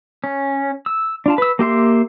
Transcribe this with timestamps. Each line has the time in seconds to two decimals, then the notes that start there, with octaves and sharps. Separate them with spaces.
0.24 C#4
0.86 E6
1.26 D4 F4 A5
1.38 B4 E6
1.59 A#3 G4 E5 C6